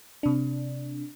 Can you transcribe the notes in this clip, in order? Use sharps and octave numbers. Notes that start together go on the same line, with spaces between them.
C3 D4